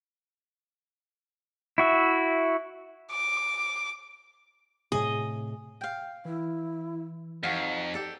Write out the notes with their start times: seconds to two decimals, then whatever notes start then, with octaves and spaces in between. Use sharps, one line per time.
1.78 E4 F#4 E5
3.12 D6
4.92 A2 C3 G#4 D#5
5.81 F5 G5
6.25 E3 E4
7.43 F2 D#4 F#4 F5
7.94 G4 A4 D5